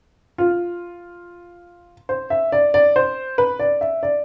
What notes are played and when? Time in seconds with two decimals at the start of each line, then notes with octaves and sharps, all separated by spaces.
0.38 F4
2.09 C5
2.30 E5
2.52 D5
2.74 D5
2.96 C5
3.38 B4
3.59 D5
3.81 E5
4.03 D5